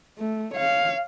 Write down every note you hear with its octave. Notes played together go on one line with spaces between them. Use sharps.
A3
C#5 F5